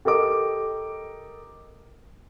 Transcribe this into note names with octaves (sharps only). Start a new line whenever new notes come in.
G4 A4 A#4 D#5 D6